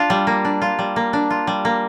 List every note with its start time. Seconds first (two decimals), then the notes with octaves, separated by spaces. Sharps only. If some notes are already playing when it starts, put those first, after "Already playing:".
Already playing: D4 F4
0.10 G3
0.27 A#3
0.45 D4
0.62 F4
0.79 G3
0.96 A#3
1.13 D4
1.30 F4
1.47 G3
1.65 A#3